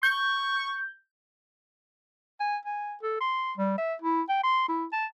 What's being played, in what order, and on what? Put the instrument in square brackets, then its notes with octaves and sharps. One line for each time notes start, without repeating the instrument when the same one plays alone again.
[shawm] C#6 [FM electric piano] G6
[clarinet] G#5
G#5
A4
C6
G3
E5
E4
G5
C6
E4
A5